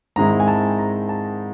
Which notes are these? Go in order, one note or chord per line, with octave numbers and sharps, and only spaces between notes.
G#2 D#3 G#3 C4 E4 A#5
G#5
A5
A#5
A5